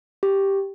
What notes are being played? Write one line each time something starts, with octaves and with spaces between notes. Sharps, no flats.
G4